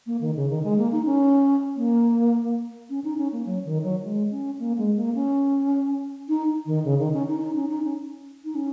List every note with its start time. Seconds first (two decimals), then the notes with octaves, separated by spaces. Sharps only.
0.07 A#3
0.21 D#3
0.36 C#3
0.49 D#3
0.64 G#3
0.78 A#3
0.92 D#4
1.05 C#4
1.77 A#3
2.90 C#4
3.04 D#4
3.18 C#4
3.32 A#3
3.46 F#3
3.65 D#3
3.84 F#3
4.03 G#3
4.31 C#4
4.59 A#3
4.78 G#3
4.97 A#3
5.15 C#4
6.29 D#4
6.66 D#3
6.84 C#3
6.99 D#3
7.13 C#4
7.28 D#4
7.41 D#4
7.56 C#4
7.69 D#4
7.84 C#4
8.45 D#4
8.55 C#4